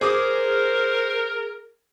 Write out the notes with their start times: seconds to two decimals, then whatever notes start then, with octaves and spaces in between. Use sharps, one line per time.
0.01 G#4 A#4 C5 D6 D#6